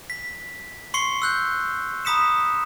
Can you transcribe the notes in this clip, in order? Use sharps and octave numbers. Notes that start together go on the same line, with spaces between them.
B6
C6 C#6 C7 C#7 G7
E6 F#6 G6
A#5 B5 D#6 B6 C#7 E7